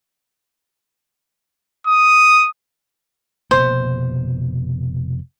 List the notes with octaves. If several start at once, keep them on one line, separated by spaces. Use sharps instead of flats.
D#6
F1 B2 A#3 C5